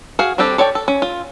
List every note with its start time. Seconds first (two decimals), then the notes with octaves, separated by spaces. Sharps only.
0.19 F#4 G#4 F5
0.38 G3 C4 D4 G4 A4
0.58 A4 C#5 D5 G5
0.75 A4
0.88 C#4
1.02 F4